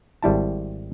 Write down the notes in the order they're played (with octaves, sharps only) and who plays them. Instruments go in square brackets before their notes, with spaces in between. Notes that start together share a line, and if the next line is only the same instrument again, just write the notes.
[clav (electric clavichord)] G#1 G3 E4 A5